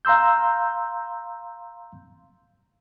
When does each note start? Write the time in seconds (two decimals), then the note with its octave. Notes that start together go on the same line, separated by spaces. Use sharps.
0.05 F5 A#5 C6 E6 G6